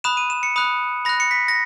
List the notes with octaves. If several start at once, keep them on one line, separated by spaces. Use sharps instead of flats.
B5 D#6 F#6 E7
D#7
E7
C#7
B5 D#6 F#6
B5 F#6 A#6
C#7
B6
A#6